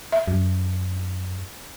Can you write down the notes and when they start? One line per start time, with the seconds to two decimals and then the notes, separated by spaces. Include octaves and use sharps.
0.12 E5
0.28 F#2